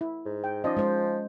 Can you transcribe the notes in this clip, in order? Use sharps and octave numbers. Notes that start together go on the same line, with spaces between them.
E4
G#2
G5
F3 C#4 D#4 D5 D#5
G#3 C5